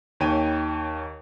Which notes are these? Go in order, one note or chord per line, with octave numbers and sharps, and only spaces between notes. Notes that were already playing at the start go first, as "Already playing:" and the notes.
D#2 D#4 C#5 G5 G#5 D#7